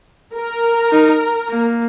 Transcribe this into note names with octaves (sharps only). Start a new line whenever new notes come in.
A#4
D#4
A#3